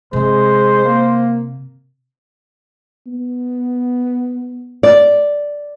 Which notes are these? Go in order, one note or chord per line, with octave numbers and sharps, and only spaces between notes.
C3 G#3 C5
A#3
B3
D5